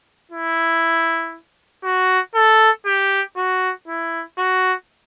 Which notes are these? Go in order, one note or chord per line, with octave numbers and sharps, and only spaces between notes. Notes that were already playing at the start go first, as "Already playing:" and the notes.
E4
F#4
A4
G4
F#4
E4
F#4